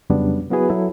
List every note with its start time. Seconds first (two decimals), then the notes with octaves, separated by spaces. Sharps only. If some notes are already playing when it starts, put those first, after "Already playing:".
0.10 F2 C#3 F#3 G3 B3 D4
0.51 F#3 B3 E4 F#4 G#4 B4
0.69 F#3 E4 A4